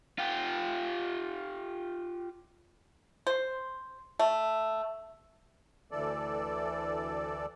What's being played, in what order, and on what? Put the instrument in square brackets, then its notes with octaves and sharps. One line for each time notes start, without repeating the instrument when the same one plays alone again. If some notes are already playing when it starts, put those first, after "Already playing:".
[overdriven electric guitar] F4 G4
[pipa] C5
A3
[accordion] D2 E3 A4 D5